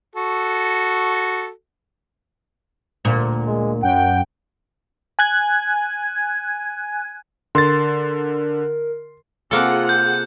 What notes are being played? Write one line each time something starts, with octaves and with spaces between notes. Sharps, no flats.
F#4 A4
D2 A#2
G#3
F#2 F#5 G5
G#5 F#6 G#6
D3 A#4 C6 A6
C3 A#3 F4 G#4 A4 F#5
G6